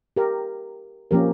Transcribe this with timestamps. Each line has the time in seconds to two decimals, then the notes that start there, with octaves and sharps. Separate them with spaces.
0.16 G4 A#4
1.11 F3 A#3 C#4 G4 A#4